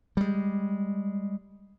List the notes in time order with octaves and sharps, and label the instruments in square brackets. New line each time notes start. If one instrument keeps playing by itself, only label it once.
[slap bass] G3 G#3